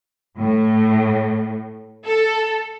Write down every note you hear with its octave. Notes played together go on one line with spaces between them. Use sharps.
A2
A4